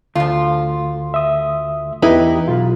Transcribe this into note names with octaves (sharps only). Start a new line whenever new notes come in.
D2 F3 F4
E5 D#6
E2 D#4 E4 G4 B4
B1 F4